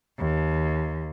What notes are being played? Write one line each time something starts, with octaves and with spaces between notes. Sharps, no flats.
D#2